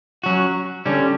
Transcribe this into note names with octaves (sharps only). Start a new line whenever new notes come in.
F#3 C#4 F#4
D3 G3 C#4